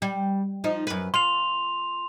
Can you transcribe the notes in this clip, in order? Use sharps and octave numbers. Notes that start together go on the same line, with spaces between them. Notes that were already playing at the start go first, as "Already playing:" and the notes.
G3
F3 D#4
F#2 B4
F4 C6 F7